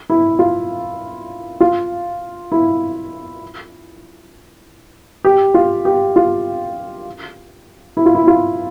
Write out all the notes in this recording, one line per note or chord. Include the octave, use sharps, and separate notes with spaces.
E4
F4
F4
E4
G4
F4
G4
F4
E4
F4
E4
F4